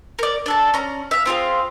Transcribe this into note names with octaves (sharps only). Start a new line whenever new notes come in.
A#4 D5
D4 A4 A5
C#4 A#5
E5 F5
C4 F4 G#4 F5